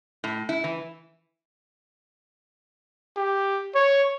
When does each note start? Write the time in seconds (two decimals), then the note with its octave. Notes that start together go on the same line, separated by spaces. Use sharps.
0.24 A2
0.49 E4
0.64 E3
3.17 G4
3.75 C#5